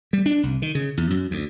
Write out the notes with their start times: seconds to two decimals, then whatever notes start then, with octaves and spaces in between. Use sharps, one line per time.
0.13 G3
0.26 D4
0.43 C2
0.62 D#3
0.75 C#3
0.97 E2
1.10 F#2
1.31 D2